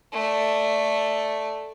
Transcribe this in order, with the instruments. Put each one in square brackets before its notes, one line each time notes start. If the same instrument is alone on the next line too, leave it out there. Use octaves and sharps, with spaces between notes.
[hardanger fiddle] A3 D5